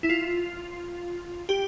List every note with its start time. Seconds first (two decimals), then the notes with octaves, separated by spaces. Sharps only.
0.03 E4
0.09 F4
1.49 G4